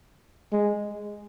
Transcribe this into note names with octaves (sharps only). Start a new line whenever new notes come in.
G#3